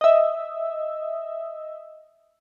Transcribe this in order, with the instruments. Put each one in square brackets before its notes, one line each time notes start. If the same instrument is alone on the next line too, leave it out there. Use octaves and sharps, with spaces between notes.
[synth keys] D#5 E5